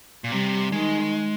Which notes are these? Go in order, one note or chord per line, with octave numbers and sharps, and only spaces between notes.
A#2
C3 G3
D#3 G#3